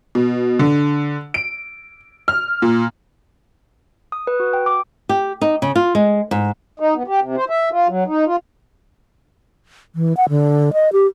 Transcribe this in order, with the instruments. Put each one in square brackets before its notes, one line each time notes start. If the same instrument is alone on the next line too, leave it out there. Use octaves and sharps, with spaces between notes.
[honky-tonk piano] B2
D3
D7
F6
A#2
[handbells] D#6
B4
F#4
G5
D6
[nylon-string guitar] G4
D#4
C#3
F4
G#3
G#2
[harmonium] D#4
B3
G4
C3
C5
E5
F4
F#3
D#4
F4
[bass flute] E3
F#5
D3
D#5
G4